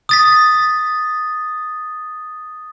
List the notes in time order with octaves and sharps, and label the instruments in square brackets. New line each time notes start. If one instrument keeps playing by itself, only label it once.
[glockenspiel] D#6 A6 B6